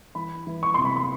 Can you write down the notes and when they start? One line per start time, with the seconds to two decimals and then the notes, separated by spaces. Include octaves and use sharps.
0.15 E3 B5
0.47 E3
0.63 C#6
0.74 C3 C6
0.85 B5
0.96 C6